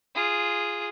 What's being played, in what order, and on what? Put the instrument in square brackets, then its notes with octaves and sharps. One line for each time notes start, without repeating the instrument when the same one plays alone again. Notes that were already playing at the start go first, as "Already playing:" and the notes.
[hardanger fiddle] F4 G#4